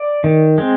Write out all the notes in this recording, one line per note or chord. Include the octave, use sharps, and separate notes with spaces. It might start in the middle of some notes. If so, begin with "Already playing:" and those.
Already playing: D5
D#3
G#3 C4